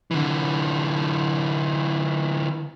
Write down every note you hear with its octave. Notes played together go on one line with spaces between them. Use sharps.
D3 E3